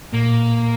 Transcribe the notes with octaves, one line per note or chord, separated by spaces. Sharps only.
A#2 A#3